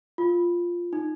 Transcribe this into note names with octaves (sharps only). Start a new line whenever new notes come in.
F4
D#4